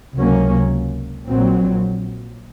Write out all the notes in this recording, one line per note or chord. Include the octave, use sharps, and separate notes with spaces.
C#2 C3 F#3 A#3 C#4
A#1 A#2 F#3 C4